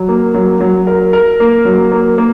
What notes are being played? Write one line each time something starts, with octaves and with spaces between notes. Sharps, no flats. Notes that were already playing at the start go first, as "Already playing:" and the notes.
Already playing: F#3
A#3
F#3
F#3
A#4
A#4
A#3
F#3
A#3
A#3